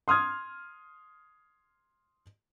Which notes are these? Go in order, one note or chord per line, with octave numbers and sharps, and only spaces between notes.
C6 D#6 F6 G#6